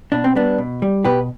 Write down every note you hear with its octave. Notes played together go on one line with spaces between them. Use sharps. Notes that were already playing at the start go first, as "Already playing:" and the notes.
B2 D4
C4
G3 B3 D4
B2
G3
B2 G4 B4